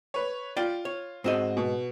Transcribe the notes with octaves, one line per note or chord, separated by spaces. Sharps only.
B4 C#5
F4 D5 G5
C#5
G#2 C4 F#4 D#5
B2